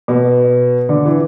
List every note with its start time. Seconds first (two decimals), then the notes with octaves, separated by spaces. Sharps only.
0.08 B2
0.89 D3
1.06 E3